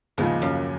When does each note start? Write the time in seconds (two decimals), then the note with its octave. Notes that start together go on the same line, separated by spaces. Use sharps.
0.18 D#2 G#2 C#3 F3 G#3
0.42 F#2